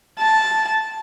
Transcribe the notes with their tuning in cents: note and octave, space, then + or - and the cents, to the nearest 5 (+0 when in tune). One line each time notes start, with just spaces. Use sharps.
A5 -5